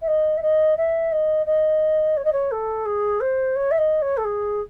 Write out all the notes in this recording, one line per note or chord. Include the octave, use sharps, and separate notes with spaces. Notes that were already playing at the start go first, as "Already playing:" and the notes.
E5
D#5
E5
D#5
E5
D#5
D#5
C#5
D#5
C#5
A4
G#4
C5
C#5
E5
D#5
C#5
A4
G#4